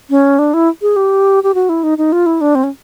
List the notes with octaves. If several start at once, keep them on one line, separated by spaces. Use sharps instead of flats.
C#4
D4
E4
G#4
G4
G4
F#4
E4
D#4
D#4
F4
E4
D4
C4
C#4